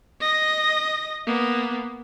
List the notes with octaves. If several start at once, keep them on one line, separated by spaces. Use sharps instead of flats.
D#5 A#6
A#3 B3